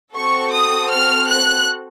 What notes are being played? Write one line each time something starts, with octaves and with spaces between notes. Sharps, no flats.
C4 F#4 A4 C#6
D#6
F6
F#6